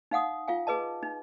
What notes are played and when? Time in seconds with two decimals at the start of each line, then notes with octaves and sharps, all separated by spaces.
0.11 D#4 F5 F#5 D#6
0.48 F4 F5 G#5
0.67 G#4 B4 D#5 A5
1.03 D#4